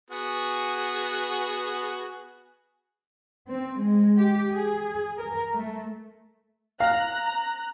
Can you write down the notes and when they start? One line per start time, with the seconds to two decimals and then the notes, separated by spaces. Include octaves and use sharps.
0.10 B3 F#4 G#4
3.47 C4
3.79 G#3
4.17 G4
4.54 G#4
5.18 A#4
5.51 A3
6.80 F5 A#5 F#6